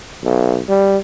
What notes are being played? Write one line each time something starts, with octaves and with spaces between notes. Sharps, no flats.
B1
G3